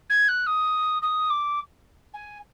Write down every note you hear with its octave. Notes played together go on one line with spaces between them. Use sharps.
G#6
F#6
D#6
D#6
D6
G#5